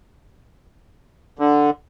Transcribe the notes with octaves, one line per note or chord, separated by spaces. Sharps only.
D3